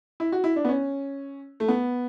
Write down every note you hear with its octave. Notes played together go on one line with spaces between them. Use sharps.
E4
F#4
E4
D4
B3
C#4
A3
B3